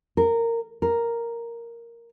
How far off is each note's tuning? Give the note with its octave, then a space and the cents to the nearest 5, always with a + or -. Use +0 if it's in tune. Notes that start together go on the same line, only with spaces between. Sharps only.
A#4 -15
A#4 +0